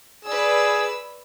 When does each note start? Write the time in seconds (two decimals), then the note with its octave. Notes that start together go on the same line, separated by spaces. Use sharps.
0.25 G#4 B4 D5 E6